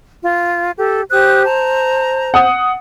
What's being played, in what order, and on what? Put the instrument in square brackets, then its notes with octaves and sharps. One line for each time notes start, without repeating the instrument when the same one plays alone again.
[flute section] F4
G4 A4
[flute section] G4 D#6 F#6 [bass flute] C5
[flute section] A5 A#5
[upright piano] F#5 D#6